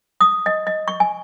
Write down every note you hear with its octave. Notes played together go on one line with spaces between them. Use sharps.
D#6
D#5
D#5
C#6
G#5